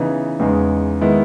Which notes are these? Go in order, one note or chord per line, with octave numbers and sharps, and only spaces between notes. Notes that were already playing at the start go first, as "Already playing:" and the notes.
Already playing: C#3 E3 B3 D#4
E2 C#3 G#3 D#4
D#3 G#3 B3 E4